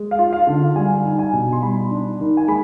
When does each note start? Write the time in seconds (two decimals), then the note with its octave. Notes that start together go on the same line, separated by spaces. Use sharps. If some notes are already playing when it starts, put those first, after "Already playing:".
Already playing: G#3
0.11 F5
0.19 F4
0.33 F5
0.47 D3
0.76 G3 G#5
1.05 D#4
1.19 G#5
1.33 B2
1.53 C6
1.62 G3 B5
1.91 D4
2.20 D#3
2.37 G#5
2.48 G#3 B5